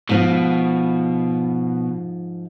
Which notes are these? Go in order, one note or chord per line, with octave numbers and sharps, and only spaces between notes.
G#2 B2 F3